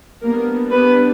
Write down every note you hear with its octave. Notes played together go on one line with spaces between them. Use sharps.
G3 A#3 B3 D4 A#4
B3 B4